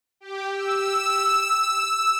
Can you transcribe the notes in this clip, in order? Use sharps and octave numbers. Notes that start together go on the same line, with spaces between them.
G4
E6